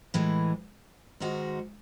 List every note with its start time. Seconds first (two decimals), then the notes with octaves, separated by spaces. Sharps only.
0.14 A2 E3 G#3
1.20 G#2 D#3 G#3 D#4 F#4